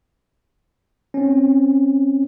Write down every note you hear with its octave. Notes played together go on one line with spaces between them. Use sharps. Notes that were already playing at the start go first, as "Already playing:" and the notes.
C4 C#4